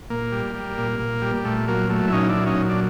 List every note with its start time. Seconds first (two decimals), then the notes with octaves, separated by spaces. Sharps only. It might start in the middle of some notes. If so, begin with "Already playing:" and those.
0.10 A#2 A#3
0.32 G3
0.55 G3
0.78 A#2
0.99 A#2
1.22 G3
1.45 A#2 A3
1.68 F#3 A#3
1.90 F#3 A3
2.08 E4
2.12 A#2 C#4 D#4
2.29 D4 E4
2.35 F#3
2.46 C#4 D#4
2.58 A#2
2.69 D4